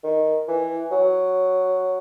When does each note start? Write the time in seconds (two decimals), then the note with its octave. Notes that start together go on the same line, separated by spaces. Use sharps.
0.04 D#3
0.48 E3
0.92 F#3